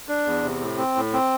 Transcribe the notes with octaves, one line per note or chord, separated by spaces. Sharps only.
D4
E2
C3
A2
C4
A2
C4